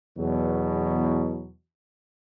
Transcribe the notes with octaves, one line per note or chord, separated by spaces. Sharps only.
E2 B2 F#3